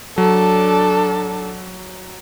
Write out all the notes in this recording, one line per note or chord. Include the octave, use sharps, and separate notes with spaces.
F#3 D4 A4